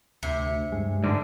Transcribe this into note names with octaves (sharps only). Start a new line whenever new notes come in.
D2 C3 C#7
G2 G#3
G#2 D3 D5